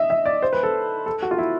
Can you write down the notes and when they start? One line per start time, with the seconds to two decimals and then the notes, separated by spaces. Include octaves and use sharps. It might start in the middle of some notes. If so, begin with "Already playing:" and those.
Already playing: D#5 E5
0.10 E5
0.26 D5
0.42 C5
0.53 B4
0.63 A4
1.06 A4
1.22 F#4
1.31 F4
1.38 E4